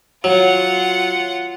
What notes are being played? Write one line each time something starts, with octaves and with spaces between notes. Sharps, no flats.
F#3 F4 F#5